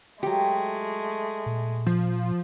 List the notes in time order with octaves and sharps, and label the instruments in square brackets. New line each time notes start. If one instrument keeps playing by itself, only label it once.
[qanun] F#3 G4 [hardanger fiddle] G#3 A3
[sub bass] A#2
[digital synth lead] F3